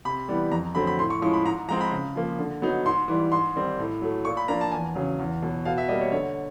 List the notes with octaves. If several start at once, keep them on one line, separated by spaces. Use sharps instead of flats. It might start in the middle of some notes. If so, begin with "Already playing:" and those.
C3 B5
E3 G3 B3
F2 A#5
D3 F#3 A3 C4 B5
B5
A2 C6
C#6
F3 G#3 C#4 E4 C#6
B5
G#2 A#5
F3 G#3 C4 A#5
B5
C#3
F3 A#3
D3
F#3 B3 D#4
G#2 C6
E3 G3
G#2 C6
D#3 G3 C4
A2
F#3 A3
A#2 C#6
B5
F3 A#3 D4 A#5
A5
E2 G#5
C#3 F#3
E2
B2 F#3
B2 F5
E5
G3 A#3 D#5
C#5
D3 C#5